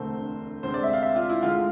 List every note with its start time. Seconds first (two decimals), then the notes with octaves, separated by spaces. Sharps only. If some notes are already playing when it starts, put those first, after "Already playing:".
Already playing: E1 D2 D3 A3 C4 C5
0.63 D2 C3 G#3 C4 C5
0.74 D5
0.83 E5
0.93 F5
1.02 E5
1.16 F4
1.29 E4
1.43 D2 D3 G#3 F4